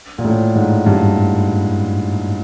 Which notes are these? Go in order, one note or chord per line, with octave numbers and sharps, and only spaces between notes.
A#2
A2
G#2
G2